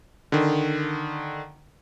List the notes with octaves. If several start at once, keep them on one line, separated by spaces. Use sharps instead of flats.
D3 D#3